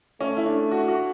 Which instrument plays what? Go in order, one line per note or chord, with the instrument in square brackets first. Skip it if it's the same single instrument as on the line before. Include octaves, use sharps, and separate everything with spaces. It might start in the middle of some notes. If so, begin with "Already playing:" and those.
[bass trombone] A3 [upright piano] C#4
[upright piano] E4
D4
F#4
F#4